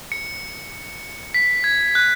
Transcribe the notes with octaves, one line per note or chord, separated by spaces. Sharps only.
C#7
B6
G#6
F#6